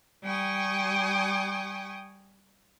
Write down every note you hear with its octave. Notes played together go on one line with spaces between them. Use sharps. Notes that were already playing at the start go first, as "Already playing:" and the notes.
G3 G5 G#5 C#6 D#6